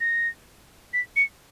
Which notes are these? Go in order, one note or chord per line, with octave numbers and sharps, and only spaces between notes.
A#6
B6
C#7